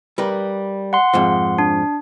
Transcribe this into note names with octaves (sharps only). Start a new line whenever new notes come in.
G3 A#4 B4
F#5 C6
F2 G#2 F3
D4